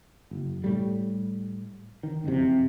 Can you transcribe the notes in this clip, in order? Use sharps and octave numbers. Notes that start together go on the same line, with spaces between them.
F#1
A2 G3
D#3
F#1 F2 C3